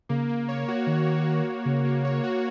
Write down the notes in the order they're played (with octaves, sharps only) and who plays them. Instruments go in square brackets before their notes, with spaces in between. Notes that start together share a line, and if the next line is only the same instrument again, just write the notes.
[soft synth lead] C#3 [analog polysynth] A#3
[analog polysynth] A#3
C#5
F#4
[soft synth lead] D#3 [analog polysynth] A#3
[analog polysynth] A#3
C#5
F#4
[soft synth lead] C#3 [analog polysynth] A#3
[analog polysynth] A#3
C#5
F#4